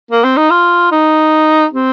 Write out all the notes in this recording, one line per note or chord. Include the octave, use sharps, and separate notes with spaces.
A#3
C4
D#4
F4
D#4
C4